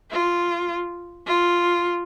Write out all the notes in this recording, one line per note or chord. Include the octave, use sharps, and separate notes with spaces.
F4
F4